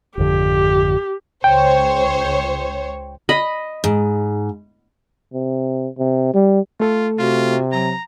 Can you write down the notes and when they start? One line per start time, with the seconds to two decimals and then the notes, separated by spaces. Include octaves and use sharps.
0.17 G#1 F2 D3 G4
1.44 C#2 C5 C#5 G5
3.29 D#5 B5
3.84 G#2
5.34 C3
5.99 C3
6.34 G3
6.80 A3 F4 A4
7.19 C3 F4 F#4
7.72 F#3 A#5